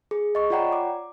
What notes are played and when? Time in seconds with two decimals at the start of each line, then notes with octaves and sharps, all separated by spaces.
0.11 G#4
0.35 D#5 C#6
0.50 F4 C#5 D5 F#5 G5 A#5
0.73 D6